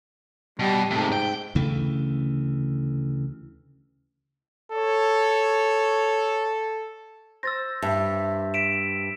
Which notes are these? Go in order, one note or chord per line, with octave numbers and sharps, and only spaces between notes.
B2 G3
G#2 C3 A3
G5
D2 C#3 E3 A3
A4 C#5
C5 E6 A6 A#6
G2 E5
B6 D7 E7